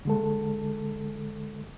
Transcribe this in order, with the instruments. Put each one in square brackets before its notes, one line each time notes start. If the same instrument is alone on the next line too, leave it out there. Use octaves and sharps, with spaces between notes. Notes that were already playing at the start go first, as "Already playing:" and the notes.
[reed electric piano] D3 G#3 A4